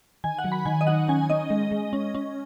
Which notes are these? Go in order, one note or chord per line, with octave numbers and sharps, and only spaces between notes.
D#3 G#5
F#5
F#3
B5
D#3 G#5
D#5
D#4 F#5
C#4 G#5
C#4 D#5
G#3
G#3
C#4
C#4